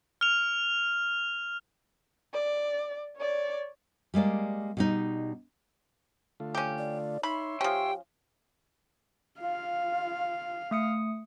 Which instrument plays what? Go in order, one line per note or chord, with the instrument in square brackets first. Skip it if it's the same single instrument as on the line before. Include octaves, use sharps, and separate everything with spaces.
[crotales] F6 F7
[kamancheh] D5
C#5 D5
[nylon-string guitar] G3 G#3 A#3 D5
B2 G3 D#4
[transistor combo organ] D3 A3 F4
[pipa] C#4 G4
[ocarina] D5
[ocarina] D#4 [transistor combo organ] C#5 E5 C6 [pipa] B5
[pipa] F3 C#4 [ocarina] G4 [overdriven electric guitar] G5
[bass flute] F4 [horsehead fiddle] F5
[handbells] A3 D#6 C#7